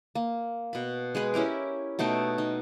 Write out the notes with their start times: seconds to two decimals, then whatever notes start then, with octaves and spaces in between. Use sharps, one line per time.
0.15 A#3
0.73 B2 B5
1.15 G#3 G#4 B4
1.34 C#4 E4 G4 A#4
1.99 B2 A3 D#4 G5
2.38 D#4